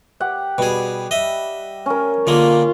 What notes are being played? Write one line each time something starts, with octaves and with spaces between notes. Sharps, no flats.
G4 F#5
B2 G3 G#4
D#5 E5
C#4 A#4
D3 G#3 A#3 F4